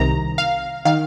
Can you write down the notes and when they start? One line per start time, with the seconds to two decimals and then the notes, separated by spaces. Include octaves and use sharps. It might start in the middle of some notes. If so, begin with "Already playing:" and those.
Already playing: C2 C3 D#3 A#5
0.38 F5
0.85 D#3 F5